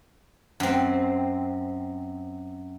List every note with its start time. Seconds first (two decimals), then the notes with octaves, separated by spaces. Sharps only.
0.60 F#2 C4